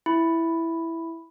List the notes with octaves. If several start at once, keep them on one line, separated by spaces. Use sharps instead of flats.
E4